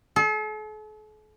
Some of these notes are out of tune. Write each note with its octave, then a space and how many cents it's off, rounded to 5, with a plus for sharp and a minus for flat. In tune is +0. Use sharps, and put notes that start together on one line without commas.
A4 -45